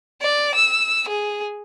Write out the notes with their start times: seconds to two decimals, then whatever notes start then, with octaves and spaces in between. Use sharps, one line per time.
0.22 D5
0.55 E6
1.08 G#4